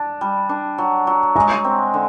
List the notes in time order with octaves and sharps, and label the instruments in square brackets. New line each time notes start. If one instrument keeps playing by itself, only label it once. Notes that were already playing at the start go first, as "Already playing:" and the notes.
Already playing: [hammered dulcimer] D4 [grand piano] A5
[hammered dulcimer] G3
D4
F#3
F#3
[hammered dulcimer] G#3 [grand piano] A#5
[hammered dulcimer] C4
D3